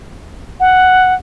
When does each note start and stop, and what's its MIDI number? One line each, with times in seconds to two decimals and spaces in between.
0.60 1.14 78